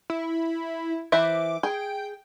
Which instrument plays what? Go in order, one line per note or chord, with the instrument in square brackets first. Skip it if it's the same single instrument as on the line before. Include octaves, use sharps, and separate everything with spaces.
[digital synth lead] E4
[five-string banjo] E3 C5 E5 [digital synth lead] D6
[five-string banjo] G#4 [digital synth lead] G5